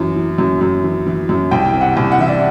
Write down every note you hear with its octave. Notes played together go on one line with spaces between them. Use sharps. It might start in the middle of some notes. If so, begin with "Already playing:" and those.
Already playing: F#2 E3
E3
F#2
F#2
E3
E3
F#2
C2 G5
C3
F#5
C2
F#5
E3 E5
D5